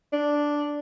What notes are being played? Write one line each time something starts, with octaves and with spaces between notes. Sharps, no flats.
D4